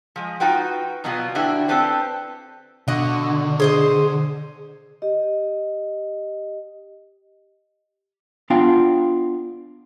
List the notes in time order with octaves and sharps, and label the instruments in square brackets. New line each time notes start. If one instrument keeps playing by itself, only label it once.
[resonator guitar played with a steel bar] F3 G#3
D#4 F4 F#4 B4 G5
B2 F#3 G3 B3 F4
D3 D4 E4 F#4 G4
C4 D4 G4 A4 B4 C5
[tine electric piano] B2 D4 C#6 [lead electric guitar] D3 [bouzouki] D#5 F#5
[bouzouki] G#4 C5 D#5
[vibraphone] G4 D#5
[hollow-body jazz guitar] B3 D4 F4 F5 G5